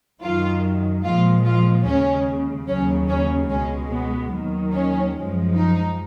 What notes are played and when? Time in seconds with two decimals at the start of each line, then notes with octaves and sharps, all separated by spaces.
0.22 F#2 D#3 F#3 F4
1.04 A#2 F3 G#3 F4
1.45 F4
1.85 D#2 C#3 G#3 C#4
2.68 D#2 C#3 F#3 C#4
3.09 C#4
3.50 C#2 B2 G#3 C#4
3.91 B3
4.31 D#2 D#3 F#3
4.73 C#4
5.13 F#2 F3 G#3
5.55 D#4